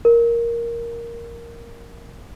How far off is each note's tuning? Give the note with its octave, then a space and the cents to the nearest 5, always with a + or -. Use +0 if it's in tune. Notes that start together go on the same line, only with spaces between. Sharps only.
A#4 +5